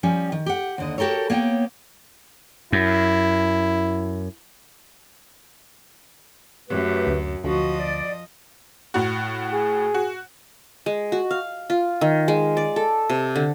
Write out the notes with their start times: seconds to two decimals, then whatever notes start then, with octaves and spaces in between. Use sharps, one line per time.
0.03 F3 G3 C#4
0.32 D#3
0.46 G4 F#5
0.78 D#2 D3 D#5
0.98 F#4 G4 A4 A#4 C#5
1.30 A#3 B3 C#5 E5 G5
2.72 F#2 E4
6.69 F#2 A3 G4 B4
7.07 D2
7.44 D2 F3 F#4 D#5
7.80 D5
8.94 A2 F#4
9.53 G#4
9.94 F#4
10.86 G#3
11.12 F#4
11.31 F5
11.70 F4
12.01 D#3
12.28 G#3
12.57 D5
12.76 A4
13.10 C3
13.36 D3